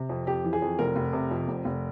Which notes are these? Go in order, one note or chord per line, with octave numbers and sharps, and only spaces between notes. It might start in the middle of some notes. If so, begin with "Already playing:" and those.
Already playing: C3
F2
F2 G4
E3
G#4
F2
F1 A#4
F1
C3
F2
F1
F1